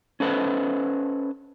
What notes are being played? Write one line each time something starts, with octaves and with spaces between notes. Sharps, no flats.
C#4 A4 B4 C5 D#5